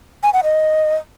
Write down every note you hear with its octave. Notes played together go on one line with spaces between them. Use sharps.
G#5
F#5
D#5